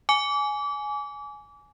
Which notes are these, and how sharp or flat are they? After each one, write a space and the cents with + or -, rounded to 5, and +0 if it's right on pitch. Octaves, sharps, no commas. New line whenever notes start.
G#5 +10 D6 -30